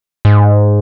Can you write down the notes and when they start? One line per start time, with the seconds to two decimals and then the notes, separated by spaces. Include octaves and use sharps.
0.25 G#2